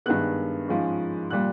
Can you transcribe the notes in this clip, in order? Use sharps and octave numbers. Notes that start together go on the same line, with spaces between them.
G2 D#3 G#3 B3 F#6
G#2 F3 G#3 C#4
A#2 G3 F#6